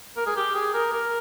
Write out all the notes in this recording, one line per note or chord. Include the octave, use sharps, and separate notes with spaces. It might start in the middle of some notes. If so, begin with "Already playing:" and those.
A#4
G#4
G4
G#4
A#4
A#4